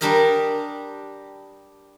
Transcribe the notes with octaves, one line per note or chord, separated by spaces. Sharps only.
G3 D4 G4 A#4 D#5